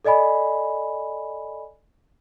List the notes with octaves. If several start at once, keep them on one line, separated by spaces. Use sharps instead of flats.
A4 D5 D#5 G#5 B5